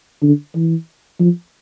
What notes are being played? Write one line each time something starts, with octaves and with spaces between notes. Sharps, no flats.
D3
E3
F3